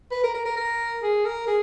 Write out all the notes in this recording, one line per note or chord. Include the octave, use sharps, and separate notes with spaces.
B4
A#4
A#4
A#4
A#4
G#4
A#4
G#4